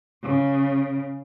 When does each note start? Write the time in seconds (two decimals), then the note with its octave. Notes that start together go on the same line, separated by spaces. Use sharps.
0.23 C#3